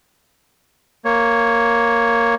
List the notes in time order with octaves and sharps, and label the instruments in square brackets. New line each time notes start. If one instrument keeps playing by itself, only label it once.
[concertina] A#3 C#5